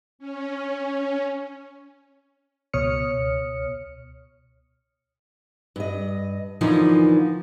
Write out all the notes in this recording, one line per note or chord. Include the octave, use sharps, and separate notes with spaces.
C#4
C#2 B2 C#5 D#6 F6 C#7
G2 D#5
D3 E3 F3 A#3 D#4